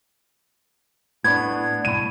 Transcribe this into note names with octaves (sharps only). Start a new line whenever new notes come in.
A2 B3 D4 G#6
C2 A2 D#7